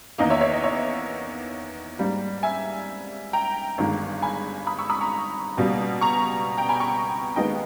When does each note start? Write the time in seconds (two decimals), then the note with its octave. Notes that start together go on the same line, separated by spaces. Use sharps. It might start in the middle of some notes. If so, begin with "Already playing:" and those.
0.18 E2 D#3 A#3 D#5
0.30 C#5 E5
0.41 C#5 E5
0.52 D#5
0.64 C#5 E5
1.99 G#2 G3 A#3
2.43 E5 G#5
3.33 G5 A#5
3.78 G1 G2 D#3 G#3
4.22 G#5 B5
4.67 B5 D#6
4.79 C#6 E6
4.90 B5 D#6
5.01 A#5 C#6
5.57 C#2 B2 G3 A#3
6.01 A#5 C#6
6.58 G5 A#5
6.69 G#5 B5
6.80 A#5 C#6
7.36 D#2 D#3 G#3 B3 D#5 G5